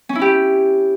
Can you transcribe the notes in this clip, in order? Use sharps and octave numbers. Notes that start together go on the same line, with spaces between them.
C#4
E4
G4